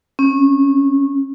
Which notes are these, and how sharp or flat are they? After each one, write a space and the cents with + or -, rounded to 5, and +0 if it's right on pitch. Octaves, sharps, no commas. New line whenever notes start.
C#4 -25